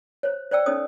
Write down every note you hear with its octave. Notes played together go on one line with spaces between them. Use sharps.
C5 C#5
C5 D5 G5 E6
C#4 D#4 A4 C5 C#5 D#6